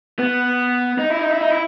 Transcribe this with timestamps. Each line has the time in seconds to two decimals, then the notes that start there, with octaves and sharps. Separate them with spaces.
0.19 B3
0.99 D#4
1.10 E4
1.19 D#4
1.31 E4
1.41 D#4
1.50 E4